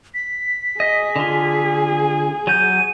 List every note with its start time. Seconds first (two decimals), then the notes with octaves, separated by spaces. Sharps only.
0.14 B6
0.80 G#4 D#5
1.16 D3 F4
2.47 F#3 G6 D#7